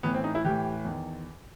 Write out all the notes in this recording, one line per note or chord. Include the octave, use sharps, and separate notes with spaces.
A2 E3 B3
C4
D#4
E4
A2 E3 G4
E2 D#3